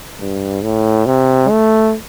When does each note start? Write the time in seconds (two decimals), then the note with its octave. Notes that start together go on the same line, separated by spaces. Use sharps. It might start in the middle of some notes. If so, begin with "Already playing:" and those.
0.21 G2
0.63 A2
1.06 C3
1.49 A3